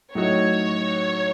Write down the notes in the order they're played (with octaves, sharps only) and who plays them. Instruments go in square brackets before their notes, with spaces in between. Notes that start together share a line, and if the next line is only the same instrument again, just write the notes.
[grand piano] A2 F#3 A3 D#4 F#4 [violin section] C#5